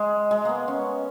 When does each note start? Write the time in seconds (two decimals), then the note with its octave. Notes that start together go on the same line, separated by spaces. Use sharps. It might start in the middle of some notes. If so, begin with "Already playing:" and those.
Already playing: G#3
0.31 G#3
0.45 A#3 B3
0.68 C#4